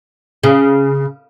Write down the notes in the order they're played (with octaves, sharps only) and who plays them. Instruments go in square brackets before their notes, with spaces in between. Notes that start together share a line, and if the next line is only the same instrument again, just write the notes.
[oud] C#3